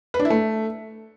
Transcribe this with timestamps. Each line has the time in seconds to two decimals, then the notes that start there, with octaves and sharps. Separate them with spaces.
0.14 B4
0.19 D4
0.25 E4
0.30 A3